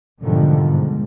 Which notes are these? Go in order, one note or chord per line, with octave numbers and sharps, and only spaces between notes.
G#2 B2 D3 D#3 F3 G3
G#2